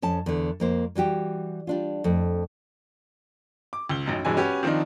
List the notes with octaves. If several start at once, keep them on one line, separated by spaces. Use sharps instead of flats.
F2 C#4 A5
E2 D3
F2 A#3 C5
E3 G3 F#4 G4
G3 D4 F4
F2 A3
D6
C#2 G7
A1 F#2 D#4
E1 G2 E3 F#3 G#3 G#5
C#4 F#4 G4 B4 G#5
D#3 F3 C4 D4 D#4